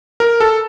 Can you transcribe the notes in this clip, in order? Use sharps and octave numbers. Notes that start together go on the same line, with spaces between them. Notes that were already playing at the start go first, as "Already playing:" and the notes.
A#4
A4